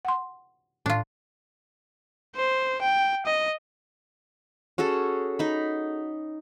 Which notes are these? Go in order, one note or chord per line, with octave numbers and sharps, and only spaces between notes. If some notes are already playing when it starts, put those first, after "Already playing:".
F#5 C6
A2 D4 F4
C5
G5
D#5
C#4 F#4 G#4 A4
D#4 B5